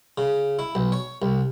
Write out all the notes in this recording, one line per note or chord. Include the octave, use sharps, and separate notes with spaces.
C#3
E4
B1
C#5
C2